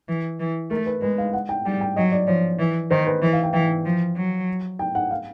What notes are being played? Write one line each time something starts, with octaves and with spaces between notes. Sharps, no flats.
E3
E3
A3 A#4
B4
G#3 B4
F5
F#5
G5
G3 G5
G5
F#3 D#5
D5
F3 C#5
E3
D#3 C5
B4
E3
F5
G5
E3 G5
F3
F#3
G5
F#5
F5